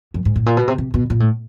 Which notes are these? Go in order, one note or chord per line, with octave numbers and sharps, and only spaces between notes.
F#2
G#2
A2
A#2
B2
C3
C3
B2
A#2
A2